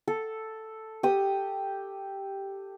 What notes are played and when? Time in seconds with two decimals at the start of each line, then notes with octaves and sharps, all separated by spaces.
0.08 A4
1.03 G4 D#6